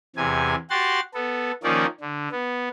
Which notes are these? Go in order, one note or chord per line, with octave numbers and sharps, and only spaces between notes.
E2 C3 G#5
F#4 G4 F#5 C6 A6
B3 A4
D#3 F3 A#3 C#4 D#4 D5
D3
B3